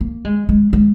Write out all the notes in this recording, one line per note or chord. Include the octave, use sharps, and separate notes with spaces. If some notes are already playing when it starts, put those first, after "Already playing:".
A#3
G#3
G#3
G#3